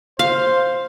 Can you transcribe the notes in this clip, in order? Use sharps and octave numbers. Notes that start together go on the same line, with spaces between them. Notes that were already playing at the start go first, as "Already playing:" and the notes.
C5 F5